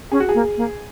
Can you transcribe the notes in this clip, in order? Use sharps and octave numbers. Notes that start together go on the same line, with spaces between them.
C#4 G#4
F#4
G#4
A#3
A#3